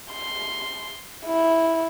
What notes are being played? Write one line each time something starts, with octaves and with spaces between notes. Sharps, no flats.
C6
E4